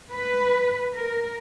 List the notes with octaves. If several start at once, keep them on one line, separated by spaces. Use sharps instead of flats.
B4
A#4